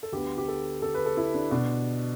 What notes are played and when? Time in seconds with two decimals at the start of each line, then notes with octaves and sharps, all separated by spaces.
0.03 A4
0.12 D2 D3 B3 G4
0.38 G4
0.48 A4
0.82 A4
0.94 B4
1.06 A4
1.17 E4
1.34 D4
1.51 B2 B3 D4